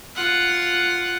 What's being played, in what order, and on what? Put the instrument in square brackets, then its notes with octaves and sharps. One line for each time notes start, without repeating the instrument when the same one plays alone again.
[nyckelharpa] F4 F#5